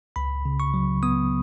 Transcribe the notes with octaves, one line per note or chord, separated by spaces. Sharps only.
C#2 B5
C#3
C#6
F#3
B3 D#6